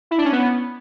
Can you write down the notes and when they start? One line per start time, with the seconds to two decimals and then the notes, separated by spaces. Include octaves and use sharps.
0.11 E4
0.18 D4
0.25 C#4
0.32 B3